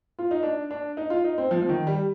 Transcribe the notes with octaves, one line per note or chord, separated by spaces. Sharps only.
F4
D#4
D4
D4
D#4
F4
D#4
C4
F3
F3
D#3
G3